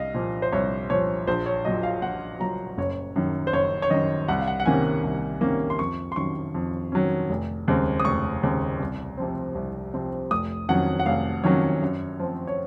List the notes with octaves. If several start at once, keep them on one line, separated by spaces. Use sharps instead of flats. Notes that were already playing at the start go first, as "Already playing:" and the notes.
Already playing: C2 D#5 F5
A#2 F3
C5
C2 C#5
A#2 F3 C#5
A#1 C5
C#5
A#2 F#3 D#5
F5
A#1 F#5
A#2 F#3 A#5
F#1 C#5
F#2 D#3
C5
F#1 C#5
C#5
F#2 D#3 D#5
C2 F#5
F5
F#5
F#5
C3 D#3 A#3 C#4 G#5
C2
C3 D#3 A#3 C#4
C6
F2 C#6
C6
D#3 F#3 C#4 C#6
F2
D#3 F#3 C#4
F1
D#2 C#3 G#3 C4
D#6
F1 C#6
D#2 C#3 G#3 C4
C2
C3 F3 C4
C2
C3 F3 C4
F1 D#6
F2 D#3 F#3 C#4 F#5
F#5
F1 F5
F2 D#3 F#3 C#4 C#5
F#2
F3 C4
C#5